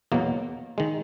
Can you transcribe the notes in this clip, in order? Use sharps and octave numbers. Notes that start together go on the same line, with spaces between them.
E2 B2 F#3 A#3
D#3 G#3